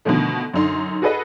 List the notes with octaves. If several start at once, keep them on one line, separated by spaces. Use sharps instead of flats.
B2 D3 D#3 F3 A3
F#2 D3 D#4 C6
F#4 G#4 A4 B4 D#5